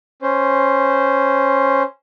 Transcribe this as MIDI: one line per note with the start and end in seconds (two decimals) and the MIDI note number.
0.22 1.83 61
0.22 1.83 72